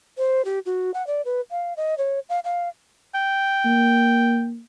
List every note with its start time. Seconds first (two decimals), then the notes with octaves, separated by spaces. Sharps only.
0.18 C5
0.45 G4
0.66 F#4
0.94 F#5
1.07 D5
1.25 B4
1.51 F5
1.77 D#5
1.98 C#5
2.29 F5
2.44 F5
3.15 G5
3.65 A#3